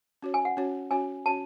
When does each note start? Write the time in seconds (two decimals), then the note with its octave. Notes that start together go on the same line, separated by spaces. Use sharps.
0.22 C#4 F#4 C#5
0.34 G#5
0.45 F#5
0.57 C#4 F#4 C#5
0.91 C#4 F#4 C#5 G#5
1.26 C#4 F#4 C#5 A5